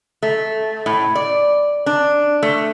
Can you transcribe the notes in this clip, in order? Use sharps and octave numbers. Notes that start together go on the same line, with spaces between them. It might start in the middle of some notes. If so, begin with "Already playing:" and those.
A3
A2
D5
D4
A3